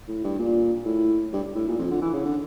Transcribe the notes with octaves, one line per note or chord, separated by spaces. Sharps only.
A2
G2
A#2
A2
G2
A2
A#2
F2
D3
E3
C#3
D3